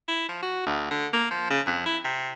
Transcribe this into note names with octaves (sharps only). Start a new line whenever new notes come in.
E4
F3
F#4
D2
D3
A#3
F3
C#3
F2
E4
C3